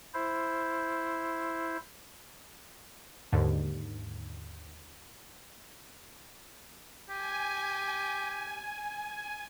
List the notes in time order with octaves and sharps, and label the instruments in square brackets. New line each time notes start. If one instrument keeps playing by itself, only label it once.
[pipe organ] E4 C5
[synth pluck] D#2 G#2 D3
[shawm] G4 [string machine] G#5